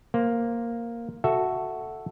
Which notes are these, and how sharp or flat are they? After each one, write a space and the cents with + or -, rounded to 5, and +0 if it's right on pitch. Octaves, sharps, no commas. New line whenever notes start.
A#3 +0 C5 +0
F#4 +0 A4 +0 E5 +0